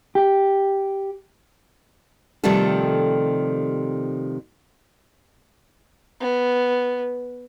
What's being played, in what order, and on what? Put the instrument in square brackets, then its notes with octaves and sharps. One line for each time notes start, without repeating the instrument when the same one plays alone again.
[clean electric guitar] G4
[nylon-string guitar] C3 D#3 F3 G3 A3 A4
[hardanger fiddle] B3